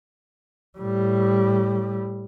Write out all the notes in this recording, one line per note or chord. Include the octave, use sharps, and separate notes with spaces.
A2 G3